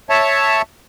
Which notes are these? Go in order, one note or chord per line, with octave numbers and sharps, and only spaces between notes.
C#5 E5 A5